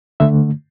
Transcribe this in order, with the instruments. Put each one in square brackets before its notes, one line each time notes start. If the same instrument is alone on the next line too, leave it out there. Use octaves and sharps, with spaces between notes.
[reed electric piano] D3 A3 E5